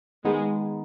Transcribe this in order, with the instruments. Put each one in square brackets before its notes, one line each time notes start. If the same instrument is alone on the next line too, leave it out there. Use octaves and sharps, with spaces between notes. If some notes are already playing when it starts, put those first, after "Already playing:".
[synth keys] D#3 B3 D#4 [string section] G#3